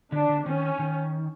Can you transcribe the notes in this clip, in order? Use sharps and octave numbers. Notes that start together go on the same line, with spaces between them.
D3 D4
D3
D#3 C#4
D#3